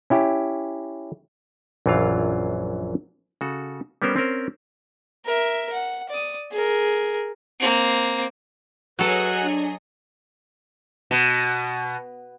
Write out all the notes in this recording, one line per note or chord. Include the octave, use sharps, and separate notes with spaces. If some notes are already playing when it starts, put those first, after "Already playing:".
C#4 E4 G4
A#1 F#2 E3 F#3 F4 F5
C#3 F#4 A4
G3 B3 C#4 A#4 C5
C4 C#4 A#4 C5
A#4 E5
F#5
D5 D#6
G#4 A#4
A#3 C4
F#3 F#4 G#4 A4 B4 C#5 D#5
D4
B2